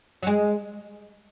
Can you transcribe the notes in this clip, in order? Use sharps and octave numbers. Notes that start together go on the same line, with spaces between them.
F#3
G#3